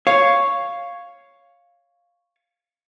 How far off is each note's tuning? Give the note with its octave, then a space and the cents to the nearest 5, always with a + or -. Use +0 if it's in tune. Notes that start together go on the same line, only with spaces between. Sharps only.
C#5 +0 F5 +0